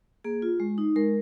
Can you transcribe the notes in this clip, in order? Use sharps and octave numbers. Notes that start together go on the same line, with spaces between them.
A#3 G#4
F4
G#3
D#4
G#3 A#4